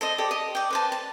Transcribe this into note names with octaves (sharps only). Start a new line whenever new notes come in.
A4 C5 D#5
G4 A4 D5 D#6
D#5
D5 G5
B4 C5 A5
A5